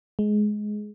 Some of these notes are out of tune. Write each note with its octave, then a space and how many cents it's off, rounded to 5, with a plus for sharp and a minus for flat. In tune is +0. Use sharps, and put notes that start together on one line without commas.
G#3 +15